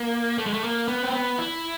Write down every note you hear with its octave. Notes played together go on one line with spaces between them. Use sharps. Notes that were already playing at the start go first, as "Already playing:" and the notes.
Already playing: A#3
A3
G#3
A3
A#3
B3
C4
B3
E4